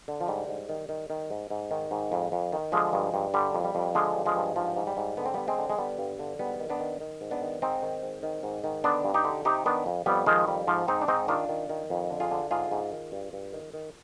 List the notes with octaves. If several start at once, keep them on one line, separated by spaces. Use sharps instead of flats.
D3
F3
G#2 G3
G#2
D#3
D#3
D#3
G#2
G#2
D#3
G#2
F2
F2
D#3
D3 F3 G#3
G2
G2
D3 G3
F2
G3
F2
D3 F3 G#3
G2
F3 G#3
G2
G#2 F3
G#2
G3
G#2
D3 B3
C4
D3 G3 B3
G#3 C4
D3
G#3
D3 G3 B3
G2
D3
G#2 G3 B3
D#3
B3 D4
D#3
D#3
G#2
B3 D4
D#3
G#2 C4 D#4
D#3
G#2
D#3
G#2
D#3
D3 B3 D4
G2
D#4 G4
D3
C3 D#4 G4
D#3 B3 D4
F2
F2 G3 B3
D#3 F3 G#3
F2 G3
G#2 F3
G#2 C4 D#4
D4
G#2 C4 D#4
D#3 D4 F4
D#3
D#3
F2
D3
F4 G#4
D3
G#2 F4 G#4
G#2
D#3
G2
G2
D#3
D#3